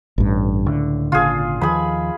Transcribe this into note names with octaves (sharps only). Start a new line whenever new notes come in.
A1 G2
C#2 A2 D3
G#1 A#2 C#3 F4 G#4
D#2 D#3 F3 G#4 B5